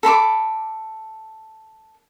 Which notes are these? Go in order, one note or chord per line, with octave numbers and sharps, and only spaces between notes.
A4 B5 C6 D6